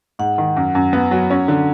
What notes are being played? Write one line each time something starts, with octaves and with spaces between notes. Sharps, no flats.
G#2 F#5
D#3
F#2
F#2
B3
F#3
C#4
D3